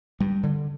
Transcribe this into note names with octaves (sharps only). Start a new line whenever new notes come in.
G2 G3
D3